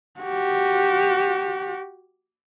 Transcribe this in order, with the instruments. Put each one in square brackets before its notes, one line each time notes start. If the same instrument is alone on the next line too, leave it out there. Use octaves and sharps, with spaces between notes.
[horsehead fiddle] F#4 G4